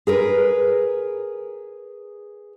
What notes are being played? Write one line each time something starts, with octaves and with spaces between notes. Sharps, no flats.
G#4 A#4 B4